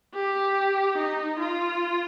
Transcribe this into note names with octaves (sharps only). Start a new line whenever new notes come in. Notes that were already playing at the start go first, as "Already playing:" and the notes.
G4
D#4
F4